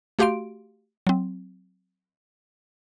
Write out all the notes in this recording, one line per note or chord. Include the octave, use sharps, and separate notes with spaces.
A3 F#4 G4 F5 C6 D7
F#3 C4